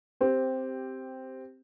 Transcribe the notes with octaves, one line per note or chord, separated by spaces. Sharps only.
C4 G4